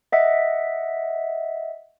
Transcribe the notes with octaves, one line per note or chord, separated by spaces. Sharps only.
D#5 E5 F#5